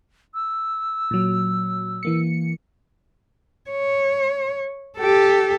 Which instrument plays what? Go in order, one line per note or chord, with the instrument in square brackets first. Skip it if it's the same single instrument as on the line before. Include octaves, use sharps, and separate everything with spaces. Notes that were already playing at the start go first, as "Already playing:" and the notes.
[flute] E6
[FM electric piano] A#2 F#3
E3 A#3 C#7
[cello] C#5
G4 A4